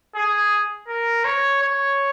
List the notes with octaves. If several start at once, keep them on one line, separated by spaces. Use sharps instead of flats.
G#4
A#4
C#5
C#5